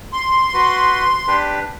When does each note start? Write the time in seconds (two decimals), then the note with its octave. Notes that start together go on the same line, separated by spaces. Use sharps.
0.13 C6
0.54 F#4 B4
1.28 D4 G4 B4